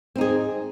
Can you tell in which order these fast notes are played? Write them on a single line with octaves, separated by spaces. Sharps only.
C4 D#4 G#4